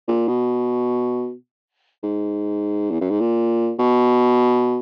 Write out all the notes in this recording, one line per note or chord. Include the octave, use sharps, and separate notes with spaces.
A#2
B2
G#2
E2
F#2
G#2
A#2
B2